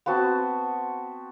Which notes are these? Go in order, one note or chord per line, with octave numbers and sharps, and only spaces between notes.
B3 C4 F#4 A5